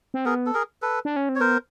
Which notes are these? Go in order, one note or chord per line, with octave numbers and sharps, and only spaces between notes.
C4
B3 G#4 A#4
A4
G#4 A#4
A4 B4
D4
C#4
C4
C#5
B3 A#4 C5